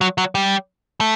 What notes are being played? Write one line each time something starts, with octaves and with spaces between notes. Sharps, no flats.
F#3
F#3
G3
A3